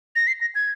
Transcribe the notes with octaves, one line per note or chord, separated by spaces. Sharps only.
A#6
C7
A#6
G#6